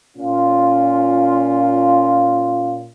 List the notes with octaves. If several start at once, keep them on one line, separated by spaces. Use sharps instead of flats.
A#2 C#4 F4